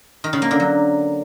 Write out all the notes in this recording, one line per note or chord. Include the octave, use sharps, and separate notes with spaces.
D#3
C#3
A#3
D3
F#3